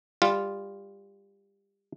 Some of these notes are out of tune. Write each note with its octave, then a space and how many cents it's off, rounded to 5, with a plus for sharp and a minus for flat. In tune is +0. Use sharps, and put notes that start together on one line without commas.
G3 +20 F4 +0